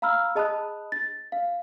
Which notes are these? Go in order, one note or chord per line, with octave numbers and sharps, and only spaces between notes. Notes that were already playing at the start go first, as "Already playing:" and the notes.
F5 A#5 B5 E6 F6
G#4 D#5 A5 B5 D#6 F#6
A6
F5